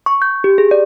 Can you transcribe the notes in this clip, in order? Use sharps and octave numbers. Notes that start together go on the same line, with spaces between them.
C#6
G6
G4
G#4
D5